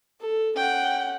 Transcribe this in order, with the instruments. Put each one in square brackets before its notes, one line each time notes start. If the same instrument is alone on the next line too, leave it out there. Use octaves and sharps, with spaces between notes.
[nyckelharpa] A4
[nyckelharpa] C#4 F#5 [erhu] G5